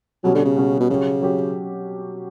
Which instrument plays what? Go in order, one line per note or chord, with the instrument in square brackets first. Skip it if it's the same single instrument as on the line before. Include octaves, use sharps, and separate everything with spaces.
[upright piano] B2 G3 C#4 [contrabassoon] F#3
[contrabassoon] D3
C#3
[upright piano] B2 G3 C#4
[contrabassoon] B2
[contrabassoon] C#3 [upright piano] F#3 C#4 G4
[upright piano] F#3 C#4 G4